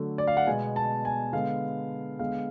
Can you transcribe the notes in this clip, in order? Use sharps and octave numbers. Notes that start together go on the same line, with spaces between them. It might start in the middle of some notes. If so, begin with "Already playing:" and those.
Already playing: D3 F#3 A3
D5
F5
F#5
B2 G#3 B3 G#5
A5
G#5
D3 G#3 B3 F5
D3 G#3 B3 F5